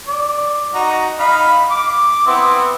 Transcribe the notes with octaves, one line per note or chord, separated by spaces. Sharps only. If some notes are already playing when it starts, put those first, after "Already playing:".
D5
D#4 F#4 A#5
D#4 F5 B5
D6
B3 C4 E4